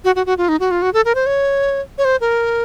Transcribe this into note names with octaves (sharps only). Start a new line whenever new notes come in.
F#4
F#4
F#4
F4
D#4
F#4
F4
F#4
A4
A#4
C5
C#5
C#5
C5
A#4